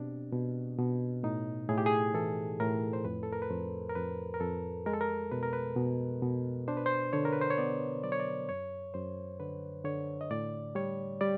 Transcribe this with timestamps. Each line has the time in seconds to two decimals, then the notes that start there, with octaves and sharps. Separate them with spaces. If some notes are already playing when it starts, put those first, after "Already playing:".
Already playing: B2 C4 D4 G4
0.33 B2
0.79 B2
1.23 A2 D#4
1.69 A2 G#4
1.78 G4
1.86 G#4
2.14 E3 A4
2.60 A2 A#4
2.93 C5
3.05 F2 B4
3.23 A4
3.32 A#4
3.42 B4
3.50 F2 C5
3.89 A#4
3.95 F2 B4
4.34 A#4
4.40 F2 A4
4.86 G#3 A#4
4.93 A4
5.01 A#4
5.32 B2 B4
5.43 A#4
5.53 B4
5.76 B2
6.22 B2
6.68 D4 C5
6.77 B4
6.86 C5
7.13 D3 C#5
7.25 A#4
7.33 B4
7.41 C5
7.50 C#5
7.58 B3 D5
8.03 F#3 D5
8.12 C#5
8.20 D5
8.49 F#2 C#5
8.94 F#2 C5
9.40 D3 B4
9.84 D3 C#5
10.21 D#5
10.31 A2 D5
10.75 G3 C#5
11.21 G3 D5